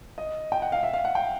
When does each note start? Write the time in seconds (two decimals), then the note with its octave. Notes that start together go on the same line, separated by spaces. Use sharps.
0.18 D#5
0.52 G5
0.62 F#5
0.72 F5
0.83 E5
0.93 F5
1.05 F#5
1.15 G5